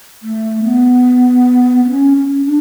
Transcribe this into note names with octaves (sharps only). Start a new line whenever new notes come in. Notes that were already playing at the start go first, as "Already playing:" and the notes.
A3
B3
B3
C#4
C#4
D4